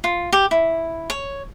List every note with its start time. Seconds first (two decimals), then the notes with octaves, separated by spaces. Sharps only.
0.04 F4
0.32 G4
0.51 E4
1.10 C#5